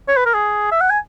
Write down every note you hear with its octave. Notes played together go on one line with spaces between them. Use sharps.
C#5
B4
A#4
G#4
E5
F#5
G#5